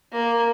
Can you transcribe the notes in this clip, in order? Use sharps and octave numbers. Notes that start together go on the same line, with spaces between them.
A#3